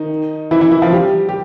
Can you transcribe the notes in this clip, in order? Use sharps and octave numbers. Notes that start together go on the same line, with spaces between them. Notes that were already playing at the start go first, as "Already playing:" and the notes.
Already playing: D#3 D#4
E3 E4
E3 E4
E3 E4
F3 F4
G3 G4
G4